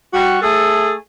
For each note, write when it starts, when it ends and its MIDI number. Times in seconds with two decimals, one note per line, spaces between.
0.14 0.37 55
0.14 0.37 66
0.42 0.93 57
0.42 0.93 68
0.42 0.93 69